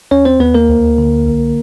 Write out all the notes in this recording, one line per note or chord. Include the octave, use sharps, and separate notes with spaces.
D#2 C#4 C#5
C4 C5
D#2 B3 B4
A#3 A#4
D2
D3
C2